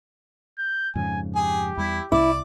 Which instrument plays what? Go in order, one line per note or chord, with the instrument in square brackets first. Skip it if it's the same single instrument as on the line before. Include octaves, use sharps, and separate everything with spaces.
[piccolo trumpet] G6
[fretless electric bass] F2 G#2 C#3 [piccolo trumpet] G#5
[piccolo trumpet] G4 [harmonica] G#4
[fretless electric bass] E2 G3 [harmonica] E4
[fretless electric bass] C2 [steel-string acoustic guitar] E4 [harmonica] D5